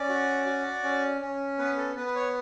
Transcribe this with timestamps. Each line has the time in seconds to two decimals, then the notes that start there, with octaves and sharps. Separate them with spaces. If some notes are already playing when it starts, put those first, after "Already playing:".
Already playing: C#4 D5
0.09 F#4
0.46 F#4
0.83 C#4
1.21 C#4
1.59 B3 B4
1.77 A4
1.96 B3 B4
2.07 B4
2.15 C#5